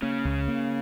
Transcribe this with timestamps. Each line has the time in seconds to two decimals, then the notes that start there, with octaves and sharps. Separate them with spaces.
0.02 C#3 A#3 C#4
0.25 C#2
0.48 A#3